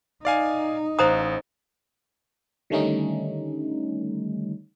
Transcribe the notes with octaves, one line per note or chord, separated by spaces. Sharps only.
D#4 D5 F5 G#5
A1 C5 F5 A#5 D#6
D3 D#3 G3 A3 C#4 D#4